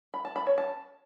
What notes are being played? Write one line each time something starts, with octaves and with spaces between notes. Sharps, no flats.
B5
A5
B5
C#5
A5